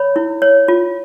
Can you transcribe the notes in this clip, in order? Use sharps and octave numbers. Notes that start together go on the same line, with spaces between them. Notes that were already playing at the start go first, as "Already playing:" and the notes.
Already playing: C#5 B5
E4
C#5
F4